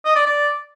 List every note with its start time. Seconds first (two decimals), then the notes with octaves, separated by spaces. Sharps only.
0.05 D#5
0.16 D5
0.26 D5